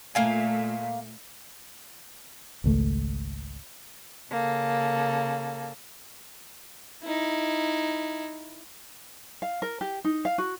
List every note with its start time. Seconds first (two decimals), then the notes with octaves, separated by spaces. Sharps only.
0.15 A#2 A3 A#3 F5 G#5
2.64 G#1 C#2 A3
4.30 C#3 A#3 A4
7.04 D#4 E4
9.42 F5
9.62 A#4
9.81 G4
10.04 D#4
10.25 F5
10.38 F#4